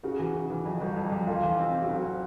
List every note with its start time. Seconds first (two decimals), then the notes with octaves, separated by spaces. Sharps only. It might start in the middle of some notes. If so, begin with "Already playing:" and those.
0.03 C#3 F#4
0.19 E3
0.34 C#3
0.50 E3
0.65 F2
0.81 G1
0.97 F2
1.12 F2
1.27 A3 F4
1.43 E3
1.58 C4
1.74 C4
1.82 F#4
1.89 F#1 F4